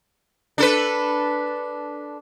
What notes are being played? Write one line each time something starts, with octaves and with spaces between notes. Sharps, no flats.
D4 A4 B4